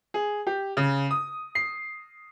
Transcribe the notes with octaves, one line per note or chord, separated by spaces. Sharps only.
G#4
G4
C#3
D#6
C7